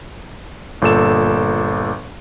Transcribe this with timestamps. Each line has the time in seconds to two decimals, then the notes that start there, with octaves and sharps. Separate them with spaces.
0.82 G1 A#2 A4 E7